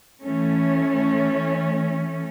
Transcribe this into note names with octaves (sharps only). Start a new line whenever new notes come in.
E3 A3 C#4